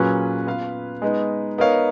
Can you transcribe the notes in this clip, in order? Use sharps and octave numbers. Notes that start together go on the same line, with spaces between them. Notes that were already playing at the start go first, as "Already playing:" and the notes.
Already playing: A#2 F#3 C#4 G#4 B4
B3 F4 B4 F5
G#3 B3 D#4
B3 D#4 A#4 C#5 F5